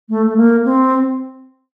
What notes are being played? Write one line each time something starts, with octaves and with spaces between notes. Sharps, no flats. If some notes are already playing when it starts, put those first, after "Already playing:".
A3
A3
A#3
C4